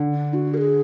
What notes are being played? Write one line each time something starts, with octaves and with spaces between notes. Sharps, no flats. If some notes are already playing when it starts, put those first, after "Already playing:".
Already playing: D3
D4
F#4
A#4
G#4